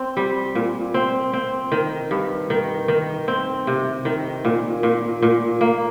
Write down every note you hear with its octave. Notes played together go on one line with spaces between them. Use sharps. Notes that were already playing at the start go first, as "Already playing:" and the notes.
Already playing: C4
G3
A#2
C4
C4
D#3
G2
D#3
D#3
C4
C3
D#3
A#2
A#2
A#2
A#3